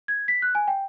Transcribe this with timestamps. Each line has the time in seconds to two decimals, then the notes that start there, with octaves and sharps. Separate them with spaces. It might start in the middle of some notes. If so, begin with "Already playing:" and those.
0.08 G#6
0.28 B6
0.42 F#6
0.55 G#5
0.68 G5